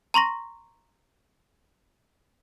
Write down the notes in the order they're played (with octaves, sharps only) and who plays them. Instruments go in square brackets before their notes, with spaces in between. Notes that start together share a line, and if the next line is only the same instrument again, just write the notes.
[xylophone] A#5 C6 C#6 A#6